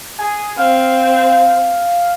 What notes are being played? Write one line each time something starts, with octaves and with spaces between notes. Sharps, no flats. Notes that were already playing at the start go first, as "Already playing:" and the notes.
G#4 G#5
C4 F5